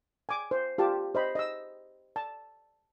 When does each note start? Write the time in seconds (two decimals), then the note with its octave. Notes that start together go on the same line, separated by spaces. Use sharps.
0.29 G#5 D6
0.51 C5
0.78 F4 G4 A5
1.15 C5 D#5 B5
1.35 D#5 E6
2.16 A5